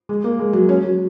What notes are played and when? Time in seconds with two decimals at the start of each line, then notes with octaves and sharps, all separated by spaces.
0.09 G#3
0.24 A#3
0.39 G#3
0.53 F#3
0.69 C#4
0.84 F#3